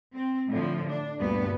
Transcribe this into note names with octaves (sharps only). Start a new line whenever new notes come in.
C4
A2 D3 F3
D4
D2 G2 A#2 G3 B3 B4